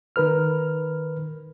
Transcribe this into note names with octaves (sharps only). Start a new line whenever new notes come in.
D#3 A#4 B4 F6